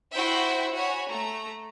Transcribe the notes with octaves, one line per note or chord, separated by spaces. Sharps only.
E4 F#4 C5 E5 G5
F#4 C#5 G#5 B5
A3 A#5